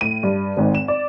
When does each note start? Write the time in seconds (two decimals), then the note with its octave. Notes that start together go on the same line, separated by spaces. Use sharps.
0.01 A2 D#7
0.23 G2
0.57 G#1 G#2
0.75 E7
0.88 D5